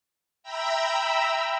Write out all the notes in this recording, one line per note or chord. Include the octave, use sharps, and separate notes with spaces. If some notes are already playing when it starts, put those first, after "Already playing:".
E5 G5 A#5 B5 E6